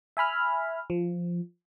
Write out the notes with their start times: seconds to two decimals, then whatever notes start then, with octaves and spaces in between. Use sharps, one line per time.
0.17 E5 G#5 B5 F6
0.90 F3